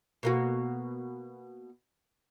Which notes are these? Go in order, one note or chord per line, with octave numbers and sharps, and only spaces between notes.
B2 A#3 F#4